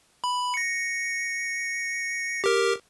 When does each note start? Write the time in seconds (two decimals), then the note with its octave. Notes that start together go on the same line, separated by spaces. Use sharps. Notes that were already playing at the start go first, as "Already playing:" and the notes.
0.24 B5
0.54 A#6 C#7
2.44 G4 A#4